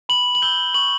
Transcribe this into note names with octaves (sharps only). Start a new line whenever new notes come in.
B5 F#7
F#7
E6 G6 G7
C#6 F#7